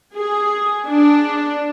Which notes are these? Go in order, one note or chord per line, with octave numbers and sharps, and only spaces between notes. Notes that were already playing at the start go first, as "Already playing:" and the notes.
G#4
D4